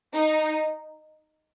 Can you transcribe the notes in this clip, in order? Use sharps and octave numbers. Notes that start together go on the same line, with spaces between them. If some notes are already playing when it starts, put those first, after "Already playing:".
D#4